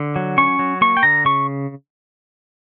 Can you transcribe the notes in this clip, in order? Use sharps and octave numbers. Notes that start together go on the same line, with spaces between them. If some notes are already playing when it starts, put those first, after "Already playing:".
Already playing: D3
F#3
C#4 C#6
F#3
A#3 C#6
G5
D3 A#5
C#3 C#6